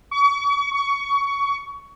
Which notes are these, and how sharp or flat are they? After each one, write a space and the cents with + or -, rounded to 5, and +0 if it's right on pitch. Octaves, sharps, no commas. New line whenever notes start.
C#6 +35
C#6 +20